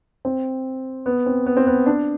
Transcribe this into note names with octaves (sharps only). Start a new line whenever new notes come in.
C4
B3
C4
B3
C4
B3
D4